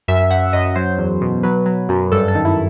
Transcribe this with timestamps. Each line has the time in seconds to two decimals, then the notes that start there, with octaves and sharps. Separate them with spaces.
0.08 F#2 E5
0.30 F#2 F#5
0.53 F#2 D#5
0.76 F#3 C5
0.98 E2
1.21 B2
1.43 F#3 B4
1.66 F#3
1.89 F#2
2.12 G2 A4
2.28 A4
2.35 D#3
2.45 E4